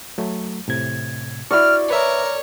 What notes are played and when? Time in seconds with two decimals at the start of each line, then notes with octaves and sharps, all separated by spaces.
0.18 F#3 A3
0.68 A2 C3 G#6
1.51 E4 F#4 D5 C#6 F6
1.90 A#4 B4 C#5 E5